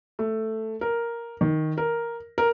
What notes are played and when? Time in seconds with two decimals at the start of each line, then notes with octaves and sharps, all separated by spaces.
0.19 A3
0.81 A#4
1.41 D#3
1.78 A#4
2.38 A#4